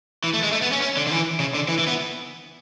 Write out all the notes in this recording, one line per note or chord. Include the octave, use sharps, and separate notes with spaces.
E3
A3
G#3
A3
B3
C#4
C#4
D3
D3
E3
C#3
D3
E3
E3
B3